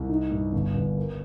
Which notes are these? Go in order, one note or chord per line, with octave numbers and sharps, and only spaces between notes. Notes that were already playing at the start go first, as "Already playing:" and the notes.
Already playing: C2
D#4
G2
G1
G1
A#4